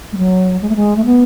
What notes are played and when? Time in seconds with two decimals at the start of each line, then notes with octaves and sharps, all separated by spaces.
0.12 G#3
0.17 F#3
0.61 G#3
0.69 A3
0.76 G#3
0.96 A3
1.05 B3